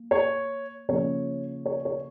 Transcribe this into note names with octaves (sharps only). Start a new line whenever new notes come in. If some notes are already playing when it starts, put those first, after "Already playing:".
Already playing: A#3
C#5
C#3 F3 A#3 C#4 C#5
C#5
C#5